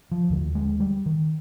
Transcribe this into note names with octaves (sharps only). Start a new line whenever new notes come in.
F3
D#2 D3
G#3
G3
D#3